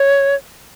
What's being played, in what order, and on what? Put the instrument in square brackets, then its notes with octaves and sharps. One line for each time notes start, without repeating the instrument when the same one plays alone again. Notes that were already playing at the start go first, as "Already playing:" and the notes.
Already playing: [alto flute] C#5